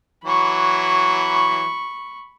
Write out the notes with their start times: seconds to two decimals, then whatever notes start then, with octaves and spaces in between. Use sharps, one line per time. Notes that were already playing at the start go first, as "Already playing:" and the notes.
0.25 E3 F#3 B5 C#6